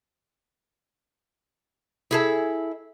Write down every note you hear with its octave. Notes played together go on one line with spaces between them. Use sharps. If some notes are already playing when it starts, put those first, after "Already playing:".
E4 G#4 A4